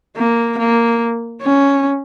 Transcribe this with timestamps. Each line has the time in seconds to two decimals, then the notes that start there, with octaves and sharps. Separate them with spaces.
0.16 A#3
0.58 A#3
1.42 C#4